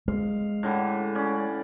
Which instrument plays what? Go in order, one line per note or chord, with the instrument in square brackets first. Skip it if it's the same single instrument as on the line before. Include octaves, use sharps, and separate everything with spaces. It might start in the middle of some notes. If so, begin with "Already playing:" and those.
[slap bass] G#3 [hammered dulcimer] F5
[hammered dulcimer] A2 D3 E3
C#4 D5